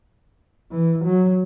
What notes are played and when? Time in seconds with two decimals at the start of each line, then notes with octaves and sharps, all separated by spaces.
0.71 E3
1.05 F#3